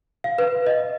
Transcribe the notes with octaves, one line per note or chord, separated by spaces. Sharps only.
F5
B4
D#5